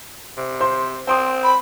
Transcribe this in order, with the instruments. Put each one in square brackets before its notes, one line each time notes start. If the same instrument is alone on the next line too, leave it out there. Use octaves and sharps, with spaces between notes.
[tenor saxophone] C3
[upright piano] C5 C6
[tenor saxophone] C4 [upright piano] G5 C6 D#6
[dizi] B5